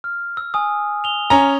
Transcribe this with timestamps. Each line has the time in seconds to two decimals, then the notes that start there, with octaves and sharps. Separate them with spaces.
0.04 F6
0.37 E6
0.54 G#5 D#6
1.04 F7 G7
1.30 C#4 A#5